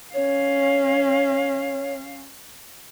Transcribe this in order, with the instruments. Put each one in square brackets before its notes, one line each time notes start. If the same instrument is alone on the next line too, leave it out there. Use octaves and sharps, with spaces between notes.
[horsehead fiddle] C#4 F5 [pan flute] C#5